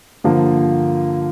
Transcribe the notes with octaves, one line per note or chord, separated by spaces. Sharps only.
G2 D3 F3 A#3